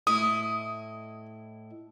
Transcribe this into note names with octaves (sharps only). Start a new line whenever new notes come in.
A2 E4 D#5 D#6